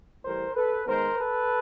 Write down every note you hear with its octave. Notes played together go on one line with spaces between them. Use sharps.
A2 E3 G3 A#4 C5
A4 B4
D#3 G#3 B3 A#4 C5
A4 B4